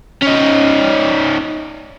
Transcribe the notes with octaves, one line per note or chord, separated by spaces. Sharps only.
C#4 D#4